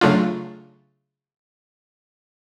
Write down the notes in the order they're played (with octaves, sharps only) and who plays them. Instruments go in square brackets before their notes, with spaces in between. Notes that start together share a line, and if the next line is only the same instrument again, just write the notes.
[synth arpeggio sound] C#3 F#3 A3 D4 F4